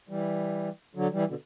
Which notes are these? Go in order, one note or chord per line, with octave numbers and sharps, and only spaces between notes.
E3 G3
D3 F#3
E3 G3
B2 D3